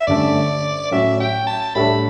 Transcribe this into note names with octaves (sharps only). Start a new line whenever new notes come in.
E5
G2 D3 A3 C#4 D5
A2 F#3 C#4 F#4 E5
G5
A5
A2 G3 D4 A4 C#5 B5